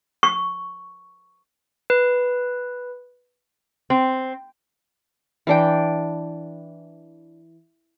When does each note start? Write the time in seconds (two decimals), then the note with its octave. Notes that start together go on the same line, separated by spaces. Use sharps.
0.23 C#6
1.90 B4
3.90 C4
5.47 E3 D4 G5